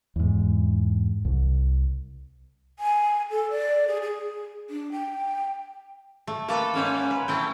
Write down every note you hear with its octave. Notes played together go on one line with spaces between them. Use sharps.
E2 G#2
C2
G#5
A4
D5
G#4
G#4
D4
G5
A3
A#3 A4 B4
G#2 C#4
B4
A3 C4 E4 G5